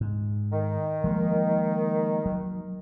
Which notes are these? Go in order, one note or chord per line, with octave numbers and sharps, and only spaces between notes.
G#2
D#3
F3 G#3 A#3
F#3